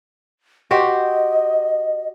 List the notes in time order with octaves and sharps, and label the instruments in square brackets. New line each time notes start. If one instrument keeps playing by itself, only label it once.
[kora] F#4 G4 C5 [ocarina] D#5